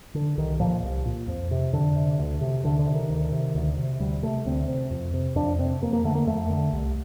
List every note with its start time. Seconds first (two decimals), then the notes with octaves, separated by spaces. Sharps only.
0.15 D3
0.38 C2 D#3
0.60 A#2 F3
0.83 C2
1.06 A#2
1.28 F2
1.51 C3
1.73 F2 D3
1.96 C3
2.19 D2
2.41 C3
2.63 D2 D3
2.79 D3
2.87 C3
2.95 D#3
3.10 D2
3.32 C3
3.55 D2
3.78 C3
4.00 D2 G3
4.23 C3 A3
4.45 D2 C4
4.68 C3
4.91 F2
5.14 C3
5.36 F2 D4
5.59 C3 C4
5.82 F2 A#3
5.93 A#3
6.04 D3 A3
6.15 A#3
6.27 F2 A3
6.50 D3
6.72 C2